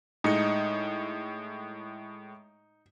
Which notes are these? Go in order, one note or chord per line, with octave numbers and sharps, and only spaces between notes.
A2 G#3 D#4 C#7